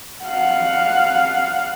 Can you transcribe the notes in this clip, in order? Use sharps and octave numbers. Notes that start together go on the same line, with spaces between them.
F5 F#5